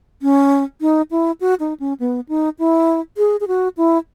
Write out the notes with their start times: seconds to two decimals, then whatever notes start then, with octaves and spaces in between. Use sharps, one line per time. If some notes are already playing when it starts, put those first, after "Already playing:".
0.22 C#4
0.81 D#4
1.11 E4
1.41 F#4
1.60 D#4
1.80 C#4
2.00 B3
2.29 D#4
2.59 E4
3.18 G#4
3.40 G#4
3.48 F#4
3.77 E4